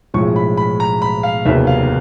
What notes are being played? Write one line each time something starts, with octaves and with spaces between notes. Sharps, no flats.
B1 A2 F3 G#3 C#6
B5
B5
A#5
B5
F5
F1 D#2 C#3 F#3 B3 E5
F5